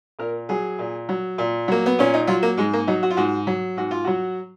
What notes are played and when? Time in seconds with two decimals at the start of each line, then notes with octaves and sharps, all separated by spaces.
0.19 A#2 A#4
0.49 F#3 G#4
0.79 A#2
1.09 F#3
1.38 A#2
1.68 F#3 A#3
1.86 B3
1.99 A#2 C#4
2.14 D#4
2.27 F#3 F4
2.43 A#3
2.57 G#2 G#3
2.73 A#3
2.87 F#3 D#4
3.03 F#4
3.10 F4
3.17 G#2 F#4
3.47 F#3
3.77 G#2 F#4
3.91 F4
4.04 F#3 F#4